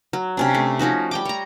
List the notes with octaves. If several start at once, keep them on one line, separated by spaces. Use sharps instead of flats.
F#3
C3 C#4 D4
A3
F3 C#4 D#4 F#4
G3 G5 D6
C#5 A#5